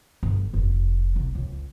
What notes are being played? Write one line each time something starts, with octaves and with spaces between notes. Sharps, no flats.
G1
F1
C2
C#2